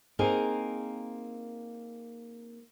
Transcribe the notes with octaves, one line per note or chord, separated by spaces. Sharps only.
A#3 C4 D#4 G#4 A#4